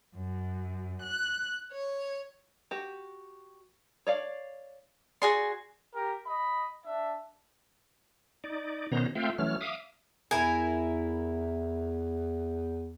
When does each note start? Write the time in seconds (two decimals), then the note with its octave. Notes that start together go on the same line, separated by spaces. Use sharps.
0.15 F#2
1.01 F#6
1.72 C#5
2.71 F#4 G4
4.07 C#5 D5 F5
5.22 F#4 G#4 D5 C6
5.96 G4 A#4
6.27 D#5 B5
6.86 D4 E5
8.44 D#4 D5
8.92 B2 D#3 B3 C#4 C5 A#5
9.15 A3 C4 F4 E5 F5 G5
9.38 E3 F#3 A3 C#4 F6
9.61 E5 F5 D6 D#6
10.31 E2 E4 A#4 G#5